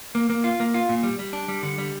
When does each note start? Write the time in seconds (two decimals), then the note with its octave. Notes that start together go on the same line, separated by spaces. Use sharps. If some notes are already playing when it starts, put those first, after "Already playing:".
0.15 A#3
0.30 A#3
0.44 F4
0.60 A#3
0.74 F4
0.89 A#2
1.03 G3
1.19 G3
1.33 D4
1.48 G3
1.63 D3
1.78 G3